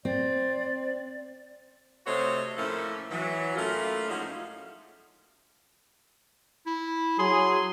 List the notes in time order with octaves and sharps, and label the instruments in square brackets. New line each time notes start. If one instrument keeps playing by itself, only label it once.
[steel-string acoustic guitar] C4 [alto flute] D5
[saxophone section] C3 A3 F#4 C5 C#5 D#5
A2 F3 A#3 C#4 A4 E5
E3 F#3
A2 A3 A#3 C#4 F4
F3 F#3 G#3 C#4 D#4
[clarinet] E4
[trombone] F#3 [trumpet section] G#4 [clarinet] C6